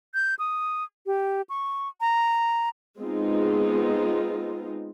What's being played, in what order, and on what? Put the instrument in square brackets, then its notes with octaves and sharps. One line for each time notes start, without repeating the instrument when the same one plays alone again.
[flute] G6
D#6
G4
C#6
A#5
[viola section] G#3 B3 C4 D#4 F4